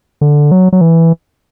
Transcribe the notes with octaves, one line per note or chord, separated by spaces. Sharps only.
D3
F#3
F#3
E3